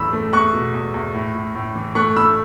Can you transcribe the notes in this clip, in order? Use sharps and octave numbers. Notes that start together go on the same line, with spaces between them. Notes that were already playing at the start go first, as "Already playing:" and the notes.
Already playing: E2 A2 E3 A3 B5 E6
A3
E2 C#6 F#6
B2
E2
E2
A2
A2
A2
E3
A3 C#6 F#6
A3 B5 E6